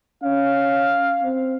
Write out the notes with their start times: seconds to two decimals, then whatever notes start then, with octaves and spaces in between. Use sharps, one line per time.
0.23 C#4 F5
1.23 C4